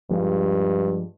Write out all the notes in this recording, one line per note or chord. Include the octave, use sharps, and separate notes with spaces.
G2 F3 G#3